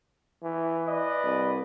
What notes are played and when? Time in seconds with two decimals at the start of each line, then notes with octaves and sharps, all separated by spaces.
0.43 E3
0.89 B4 D5 D#5
1.24 C2